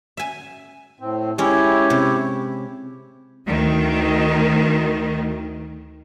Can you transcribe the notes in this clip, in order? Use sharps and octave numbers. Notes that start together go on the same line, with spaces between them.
E5 G#5
A2 C4
G#3 C#4 E4 G4 C#5
C3
D2 D#3